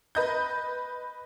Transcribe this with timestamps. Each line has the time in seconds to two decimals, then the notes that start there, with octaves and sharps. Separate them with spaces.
0.15 B4 D#5 G6